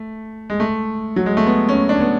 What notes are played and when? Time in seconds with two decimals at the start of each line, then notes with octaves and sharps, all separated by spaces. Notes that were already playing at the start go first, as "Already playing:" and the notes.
Already playing: A3
0.50 G#3
0.60 A3
1.16 F#3
1.26 G#3
1.37 A3
1.47 B3
1.69 C#4
1.89 D4
2.01 B3